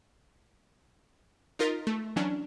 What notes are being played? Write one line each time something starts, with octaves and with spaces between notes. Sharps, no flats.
D#4 F4 A#4 D#5 A6 B6
A3
E3 F#3 C#4 D4